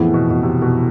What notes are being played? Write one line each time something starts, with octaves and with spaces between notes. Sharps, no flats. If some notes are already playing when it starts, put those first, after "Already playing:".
Already playing: F2 A2 E3 B3 E4 G#4
B2
B2
C3
B2